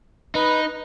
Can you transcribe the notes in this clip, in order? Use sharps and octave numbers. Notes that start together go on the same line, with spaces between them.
D#4 B4